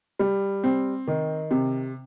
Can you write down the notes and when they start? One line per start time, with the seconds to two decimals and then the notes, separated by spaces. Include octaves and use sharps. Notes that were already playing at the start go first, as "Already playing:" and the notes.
0.19 G3
0.64 C4
1.07 D#3
1.51 C3